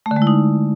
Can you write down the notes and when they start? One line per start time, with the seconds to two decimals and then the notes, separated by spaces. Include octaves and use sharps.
0.06 A3
0.11 D3
0.16 G#3
0.22 E4
0.27 D#4